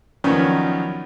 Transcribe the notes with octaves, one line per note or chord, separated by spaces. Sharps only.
D#3 F3 F#3 B3 C#4 D4